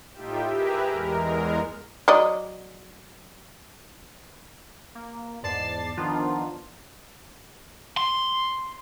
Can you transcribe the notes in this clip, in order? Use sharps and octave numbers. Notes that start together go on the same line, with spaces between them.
A2 D#4 F4 G4 E5 G5
G4 G#4 A#4 B4 E5 A#5
E2 G#3 A#4
F#3 D5 D#5
A#3
E2 G#2 D5 A5 A6 C7
D#3 F3 B3 D4 D#4 F4
C6